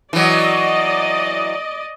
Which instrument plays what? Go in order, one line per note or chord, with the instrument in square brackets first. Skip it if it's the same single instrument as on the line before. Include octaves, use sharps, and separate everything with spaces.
[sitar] E3 F#3 [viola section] D5 D#5